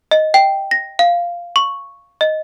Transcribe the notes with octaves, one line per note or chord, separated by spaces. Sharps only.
D#5
G5
A#6
F5
C#6
D#5